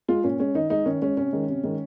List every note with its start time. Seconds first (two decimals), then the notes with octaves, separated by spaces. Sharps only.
0.08 G#3 F4
0.24 A#2 C#4
0.40 G#3 C#4
0.55 D#3 D#4
0.70 G#3 D#4
0.86 D#3 C#4
1.02 G#3 C#4
1.17 C3 C#4
1.33 D#3 G#3
1.48 C3
1.63 D#3 G#3